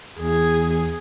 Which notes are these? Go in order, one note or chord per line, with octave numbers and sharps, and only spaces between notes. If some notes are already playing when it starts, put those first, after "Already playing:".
E2 G#4